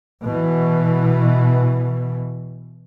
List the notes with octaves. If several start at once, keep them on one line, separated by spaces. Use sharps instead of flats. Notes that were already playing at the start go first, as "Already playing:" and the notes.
B2 E3